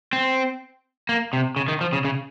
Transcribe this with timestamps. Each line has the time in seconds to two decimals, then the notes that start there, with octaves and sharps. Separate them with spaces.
0.13 C4
1.09 A#3
1.33 C3
1.56 C#3
1.68 D#3
1.81 F3
1.93 C#3
2.05 C#3